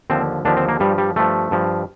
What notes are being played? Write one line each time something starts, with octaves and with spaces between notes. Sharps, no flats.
D#2 D3 F3 C4
D#2 D3 F3 D4
C4
A#3
G2 F3 G3
G3
G2 F3 A3
G2 F3